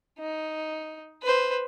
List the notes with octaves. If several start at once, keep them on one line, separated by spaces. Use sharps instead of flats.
D#4
B4 C5